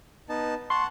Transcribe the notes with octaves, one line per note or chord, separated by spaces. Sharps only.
B3 D#4 A5
F#5 A5 C6 C#6